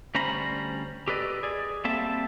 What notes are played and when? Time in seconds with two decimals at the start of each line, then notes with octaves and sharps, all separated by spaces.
0.15 D2 G3 C#4 C5 A#5 B5
1.08 G4 A4 B4 D5 D#5
1.43 G#4 D5
1.84 G3 A#3 C4 A4 E5 A5